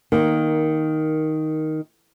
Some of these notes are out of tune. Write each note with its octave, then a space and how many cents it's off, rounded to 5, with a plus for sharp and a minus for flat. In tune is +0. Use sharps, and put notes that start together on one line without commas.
D#3 +5 A#3 +15